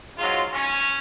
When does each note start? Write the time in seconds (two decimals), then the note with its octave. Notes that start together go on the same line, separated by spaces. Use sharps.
0.18 G#2 F#3 F4
0.53 C#4